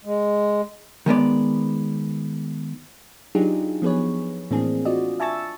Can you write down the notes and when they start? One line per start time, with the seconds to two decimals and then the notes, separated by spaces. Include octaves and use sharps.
0.05 G#3
1.06 D#3 G#3 B3 D5
3.35 F#3 D4 D#4 F4 G4 G#4
3.82 F3 B3 G#4 B4 C#5
4.51 A2 E3 A#3 C4 D4 G#4
4.85 F4 F#4 D5 D#5
5.20 E5 G#5 A5 C#6 E6 A6